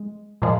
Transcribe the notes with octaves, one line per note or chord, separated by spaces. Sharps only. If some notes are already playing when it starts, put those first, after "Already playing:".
Already playing: G#3
A#2 F3 G#3